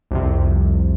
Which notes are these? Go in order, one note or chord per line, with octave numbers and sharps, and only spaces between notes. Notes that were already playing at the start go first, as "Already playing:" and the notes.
C2 F2 C3